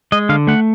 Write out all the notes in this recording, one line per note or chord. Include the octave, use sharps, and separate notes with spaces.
G#3 D#5
D3 F5
A3 F#5